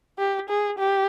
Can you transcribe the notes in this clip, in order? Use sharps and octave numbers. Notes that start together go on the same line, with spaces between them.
G4
G#4
G4